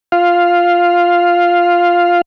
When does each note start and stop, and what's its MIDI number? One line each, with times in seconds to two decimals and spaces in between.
0.12 2.21 65
0.12 2.21 77